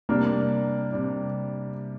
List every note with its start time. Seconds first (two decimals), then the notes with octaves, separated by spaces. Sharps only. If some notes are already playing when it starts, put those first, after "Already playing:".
0.09 C3 G3 A#3 D4
0.91 C3 G3 D4